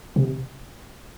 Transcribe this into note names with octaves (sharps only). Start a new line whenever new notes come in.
C3